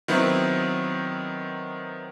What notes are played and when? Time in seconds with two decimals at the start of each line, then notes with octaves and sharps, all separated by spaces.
0.08 D#3 F#3 B3 C4 E4